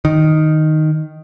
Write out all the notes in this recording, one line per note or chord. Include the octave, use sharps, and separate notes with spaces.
D#3